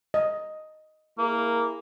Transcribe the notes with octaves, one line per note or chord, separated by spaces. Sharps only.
D#5
A#3 E4 G#4 A#4